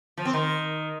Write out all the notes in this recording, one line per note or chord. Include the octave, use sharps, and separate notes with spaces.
F3
C4
D#3